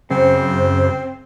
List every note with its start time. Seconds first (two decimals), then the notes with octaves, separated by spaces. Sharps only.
0.10 F#2 C#3 C4 C5